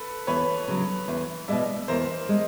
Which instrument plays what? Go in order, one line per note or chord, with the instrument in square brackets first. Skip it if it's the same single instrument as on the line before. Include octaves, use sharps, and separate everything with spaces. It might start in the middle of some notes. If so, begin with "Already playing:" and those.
Already playing: [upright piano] A4 B4
[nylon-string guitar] E2 [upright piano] B4 C#5
[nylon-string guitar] C#3 F#3
E2
[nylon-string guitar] B2 G#3 [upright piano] D5 E5
[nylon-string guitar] E2 [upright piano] A#4 C5
[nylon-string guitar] G#3